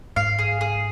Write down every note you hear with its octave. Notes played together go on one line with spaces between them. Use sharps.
G#2 F5
G#4
G#4